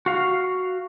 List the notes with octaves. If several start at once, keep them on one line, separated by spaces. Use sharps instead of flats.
F#4 F5